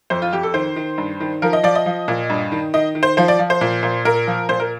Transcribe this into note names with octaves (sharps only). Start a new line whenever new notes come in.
F2 C5
F4
F2 G4
A4
D#3 C5
D#3
G2
D#3
F3 A#4
D#5
F3 D5
D#5
F3
A#2
G2
D#3
D#3 D#5
D#3
C5
F3 C5
D5
F3
C5
A#2
A#2
A#2 A#4
F3
A#2 C5
A#4